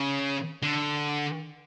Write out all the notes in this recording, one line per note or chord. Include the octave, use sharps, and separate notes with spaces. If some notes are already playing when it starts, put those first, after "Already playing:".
Already playing: C#3
D3